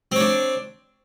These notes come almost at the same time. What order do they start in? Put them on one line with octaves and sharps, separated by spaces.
C4 C#5 D4